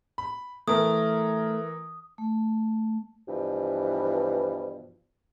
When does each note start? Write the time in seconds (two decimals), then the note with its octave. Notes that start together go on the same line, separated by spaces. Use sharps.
0.18 B5
0.68 E3 A3 A#4 D#6
2.18 A3
3.28 G2 B2 E3 F3